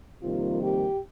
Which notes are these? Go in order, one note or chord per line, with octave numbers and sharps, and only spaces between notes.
F2 C3 D#3 G3 A#3 F4
G4